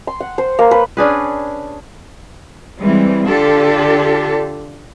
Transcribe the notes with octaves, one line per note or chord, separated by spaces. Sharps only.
C6
F#5
C5
A#3
B4
C#4 D4 G#4 B4
E3 G3 G#3 C4
D3 D4 F4 G4 A4